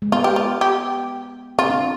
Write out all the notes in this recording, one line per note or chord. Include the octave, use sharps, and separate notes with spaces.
G#3
B3 F4
G4
F4
G4
C4 F4
D4
C4